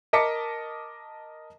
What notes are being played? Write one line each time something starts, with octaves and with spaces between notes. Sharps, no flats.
A#4 D#5 A5 D6 B6 C#7